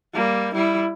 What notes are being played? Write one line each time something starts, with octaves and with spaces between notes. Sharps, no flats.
G3 A#3
G3 E4